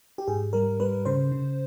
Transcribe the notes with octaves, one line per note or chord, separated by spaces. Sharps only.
G4
G#2 G#4
G3 A#4
G3 B4
C#3 C5
C#3